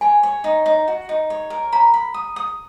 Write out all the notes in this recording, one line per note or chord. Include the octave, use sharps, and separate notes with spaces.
C#5 G#5
C#5
D#4
D#4
F#4
D#4
C#5
A#4
A#5 B5
B5
D#6
D#6